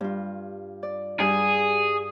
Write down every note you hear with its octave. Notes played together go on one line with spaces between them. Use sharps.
G2 F4
D5
G2 G#4